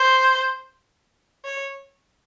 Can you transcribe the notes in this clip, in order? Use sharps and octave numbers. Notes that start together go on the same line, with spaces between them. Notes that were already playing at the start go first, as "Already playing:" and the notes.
Already playing: C5
C#5